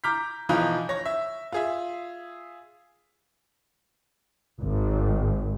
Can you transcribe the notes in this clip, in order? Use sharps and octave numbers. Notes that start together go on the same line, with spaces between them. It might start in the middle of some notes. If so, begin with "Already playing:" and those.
A#5 D6 F6 G6 B6
B1 E3 F3 D#4 F5
C#5 A#6
E5
F4 G#4 E5
G#1